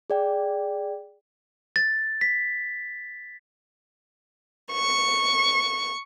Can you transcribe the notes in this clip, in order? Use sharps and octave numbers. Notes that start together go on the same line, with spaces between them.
G#4 D5 G5
A6
B6
C#6